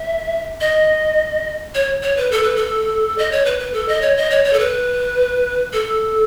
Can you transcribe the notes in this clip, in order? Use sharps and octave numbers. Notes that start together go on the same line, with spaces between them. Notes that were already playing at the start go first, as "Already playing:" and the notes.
Already playing: E5
D#5
C#5
C#5
B4
A4
B4
A4
D#5
C#5
B4
B4
A4
D#5
C#5
D#5
C#5
C#5
A4
B4
A4